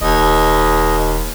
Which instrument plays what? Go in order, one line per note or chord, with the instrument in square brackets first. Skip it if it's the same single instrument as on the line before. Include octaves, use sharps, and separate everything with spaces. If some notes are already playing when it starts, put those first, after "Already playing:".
[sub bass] D#1 [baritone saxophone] D#2 [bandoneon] D#5